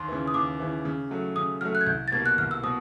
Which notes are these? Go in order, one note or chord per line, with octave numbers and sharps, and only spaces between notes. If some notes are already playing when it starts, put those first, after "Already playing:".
Already playing: D#2 C6
C#3 E3
D#6
D#2 D6
C#3 E3
C#3
F#3 A3
C#3 D#6
F#3 A3 F6
F#6
G#6
C2 G6
A6
B2 G3 A#3 G#6
F#6
C2 F6
E6
B2 D#6